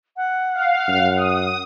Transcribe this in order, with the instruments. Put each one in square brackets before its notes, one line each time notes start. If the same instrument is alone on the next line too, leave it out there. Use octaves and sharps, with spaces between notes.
[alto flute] F#5
[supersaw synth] F5
[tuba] F#2
[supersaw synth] D#6